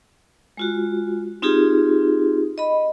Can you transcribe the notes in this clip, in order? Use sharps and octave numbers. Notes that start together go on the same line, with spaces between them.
G#3 F4 F#4
C4 D#4 F4 G4 G#4
D#5 B5